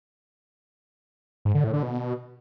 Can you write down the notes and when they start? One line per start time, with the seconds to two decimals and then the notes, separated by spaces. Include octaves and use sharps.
1.45 G#2
1.55 D3
1.64 A2
1.73 D3
1.83 B2